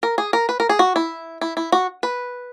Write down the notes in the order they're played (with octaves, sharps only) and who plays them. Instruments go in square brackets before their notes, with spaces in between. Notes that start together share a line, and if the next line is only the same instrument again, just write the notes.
[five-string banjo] A#4
G#4
A#4
B4
A#4
G#4
F#4
E4
E4
E4
F#4
B4